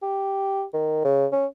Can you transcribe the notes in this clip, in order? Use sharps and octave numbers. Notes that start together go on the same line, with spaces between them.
G4
D#3
C#3
C#4